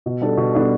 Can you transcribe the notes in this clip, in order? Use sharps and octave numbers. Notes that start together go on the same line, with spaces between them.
B2
G3 B3 D4 A4
B2
G3 B3 D4 A4